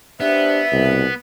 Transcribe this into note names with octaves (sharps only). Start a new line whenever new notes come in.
B3 D4 G4 C5 E5
C2 B2